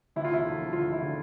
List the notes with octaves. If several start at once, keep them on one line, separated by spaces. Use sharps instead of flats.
D2 E4
F4
E1 E4
D3
F3
D2 F4
E1
E4
D3